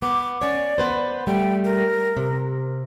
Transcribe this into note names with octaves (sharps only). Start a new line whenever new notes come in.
B3 D6
C#4 C#5 D5
B3 B4 C5
G3 A3 G5
A#4
C3